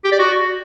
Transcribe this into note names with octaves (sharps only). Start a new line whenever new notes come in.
G4
D5
F#4